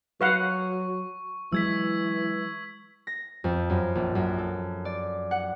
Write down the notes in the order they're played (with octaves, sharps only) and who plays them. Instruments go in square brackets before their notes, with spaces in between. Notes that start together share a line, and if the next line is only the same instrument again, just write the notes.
[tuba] F#3 [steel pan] B4 F5 F#5 [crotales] C#6
[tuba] E3 [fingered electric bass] F#3 G#3 [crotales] E6 G#6 B6
[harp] A#6
F2
F#2
A#1
F#2
A4
D5
F#5